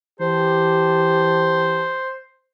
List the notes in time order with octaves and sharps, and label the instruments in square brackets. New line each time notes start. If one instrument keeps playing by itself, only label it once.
[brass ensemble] E3 G4 A5 [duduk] C5